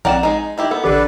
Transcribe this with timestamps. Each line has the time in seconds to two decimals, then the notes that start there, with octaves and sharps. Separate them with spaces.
0.05 A#1 C4 A#4 D5 F#5 E7
0.23 G#3 D#4
0.58 D#3 E4 G4
0.71 B3 A4
0.84 A1 D3 D4 G4 A4 B4